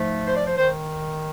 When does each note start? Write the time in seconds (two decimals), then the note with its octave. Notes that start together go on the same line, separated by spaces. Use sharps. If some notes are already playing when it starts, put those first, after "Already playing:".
Already playing: G#2 F3 A3
0.28 C5
0.37 D5
0.47 C5
0.58 D#3 C5